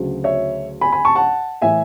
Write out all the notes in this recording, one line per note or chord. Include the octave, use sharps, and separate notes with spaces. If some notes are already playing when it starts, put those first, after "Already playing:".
Already playing: D2 C#3 F#3
C#5 E5
G#5 B5
G#5 B5
A5 C#6
F#5 A5
A2 E3 E5 G#5